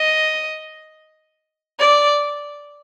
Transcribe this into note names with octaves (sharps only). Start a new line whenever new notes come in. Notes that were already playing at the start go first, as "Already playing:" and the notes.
Already playing: D#5
D5